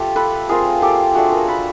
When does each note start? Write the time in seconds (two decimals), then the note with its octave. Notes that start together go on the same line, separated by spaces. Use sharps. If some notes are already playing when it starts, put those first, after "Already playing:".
Already playing: A3 F4 G4
0.16 A4 B4
0.49 A3 C4 F4 G#4 A#4
0.82 G4 A4
1.14 A3 D4 F4 F#4 G#4
1.32 G#4 A#4
1.47 A4 B4